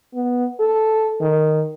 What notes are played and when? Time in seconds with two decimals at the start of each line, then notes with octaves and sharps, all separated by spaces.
0.14 B3
0.60 A4
1.21 D#3